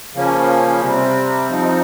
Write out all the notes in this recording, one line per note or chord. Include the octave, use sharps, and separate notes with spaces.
C#3 F3 A#3 C#4
C3 G3 C4
F3 C4 D#4